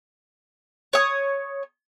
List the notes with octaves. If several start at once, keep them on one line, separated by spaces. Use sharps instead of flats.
C#5 D#6